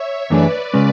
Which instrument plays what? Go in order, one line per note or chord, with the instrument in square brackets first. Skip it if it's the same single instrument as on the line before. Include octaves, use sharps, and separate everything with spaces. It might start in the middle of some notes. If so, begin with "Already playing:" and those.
Already playing: [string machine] C#5 E5
[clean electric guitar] F#2 E3 A3 D4 G#4 [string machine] B4 D5
[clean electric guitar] C#3 G#3 C#4